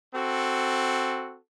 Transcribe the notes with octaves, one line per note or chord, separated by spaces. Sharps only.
C4 F#4 A4